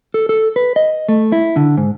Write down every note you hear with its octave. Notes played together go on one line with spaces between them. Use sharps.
A4
A4
B4
D#5
A3
E4
D3
G#2